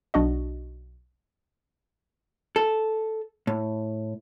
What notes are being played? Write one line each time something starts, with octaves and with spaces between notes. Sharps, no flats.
B1 D4 F#4 D#5
A4
A2